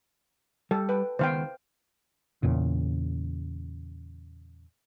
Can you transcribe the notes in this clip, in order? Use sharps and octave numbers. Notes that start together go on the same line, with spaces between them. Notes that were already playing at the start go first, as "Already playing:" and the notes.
G3 A4
B4 G5
C#2 D#3 B3 C5 F5 G5
E2 A#2 C#3